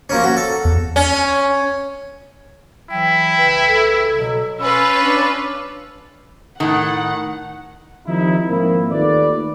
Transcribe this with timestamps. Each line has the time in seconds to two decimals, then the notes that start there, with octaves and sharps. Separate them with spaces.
0.10 F3 A#3 C#4
0.24 F#4
0.37 A4
0.65 E2
0.96 C#4
2.90 E3 F#3 E4 G5
3.38 C2 C#3 B4
3.68 A4
4.17 B2 F#3
4.59 C#4 F4 B4 B5 E6
5.01 D4
6.60 A2 D#3 F#5
8.07 D#3 F3 G3 C4 D#4 E4
8.49 G#2 F3 A#3 C4 E4
8.89 D#2 D#3 A3 F4 B4 D5